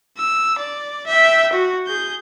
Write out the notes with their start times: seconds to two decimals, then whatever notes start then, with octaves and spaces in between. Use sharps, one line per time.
0.18 E6
0.59 D5
1.07 E5 G5
1.53 F#4
1.87 G#4 G6